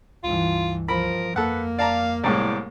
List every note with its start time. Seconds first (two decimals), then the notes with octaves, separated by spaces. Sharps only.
0.24 C#2 G2 E3 F4
0.88 F3 A#4 B5
1.36 F2 A#3 A4 B4 F#5
1.79 D5 F5 A5 A#5
2.24 C2 A2 G#3 D5